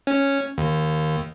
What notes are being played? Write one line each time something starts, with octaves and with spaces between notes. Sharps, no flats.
C#4
D#2